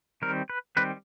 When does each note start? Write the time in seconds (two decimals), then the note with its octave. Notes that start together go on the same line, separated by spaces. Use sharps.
0.22 D#3 G3 C4 A#4
0.50 B4
0.77 D#3 G3 C4 B4